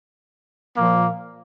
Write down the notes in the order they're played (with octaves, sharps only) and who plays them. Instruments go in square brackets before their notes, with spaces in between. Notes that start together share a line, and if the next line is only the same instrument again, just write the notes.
[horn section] A#2 F3 A#3